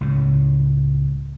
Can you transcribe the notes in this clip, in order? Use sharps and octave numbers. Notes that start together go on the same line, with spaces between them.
C#2 A2 C#3